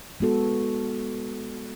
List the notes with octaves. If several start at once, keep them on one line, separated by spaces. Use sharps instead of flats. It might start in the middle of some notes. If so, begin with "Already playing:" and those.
G#3 B3 F#4 A4